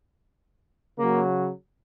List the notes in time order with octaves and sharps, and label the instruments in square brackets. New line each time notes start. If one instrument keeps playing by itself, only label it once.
[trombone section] C#3 F#3 A#3